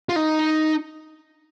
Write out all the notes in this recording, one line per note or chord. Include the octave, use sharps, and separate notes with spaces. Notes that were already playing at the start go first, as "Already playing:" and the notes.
F4
D#4